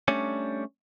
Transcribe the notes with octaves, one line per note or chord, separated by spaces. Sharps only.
G3 A3 C#4 D4 C#5